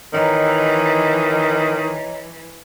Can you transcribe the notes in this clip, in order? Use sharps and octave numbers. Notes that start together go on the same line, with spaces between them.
D#3 E3 C#5 D#5 A#5